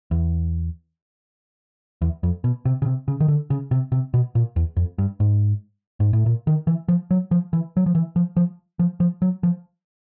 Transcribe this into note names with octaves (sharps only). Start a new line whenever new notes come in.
E2
E2
F2
B2
C3
C#3
C3
C#3
D#3
D3
C#3
C3
C3
B2
A#2
E2
F2
G2
G#2
G#2
A2
A#2
D#3
E3
F3
F#3
F3
E3
F#3
F3
E3
F3
F3
F3
F3
F#3
F3